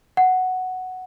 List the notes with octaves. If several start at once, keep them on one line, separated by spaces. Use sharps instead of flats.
F#5